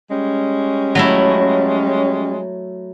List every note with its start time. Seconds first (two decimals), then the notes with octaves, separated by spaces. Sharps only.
0.10 G3 G#3 C#4
0.95 F#3 A3 E4